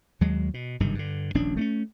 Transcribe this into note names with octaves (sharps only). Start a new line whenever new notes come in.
D#2 F#3 G#3
B2
F#1 G2 C3 D#3
G2 D3
D#1 A#1 C#4 D4
A3 C4 C#4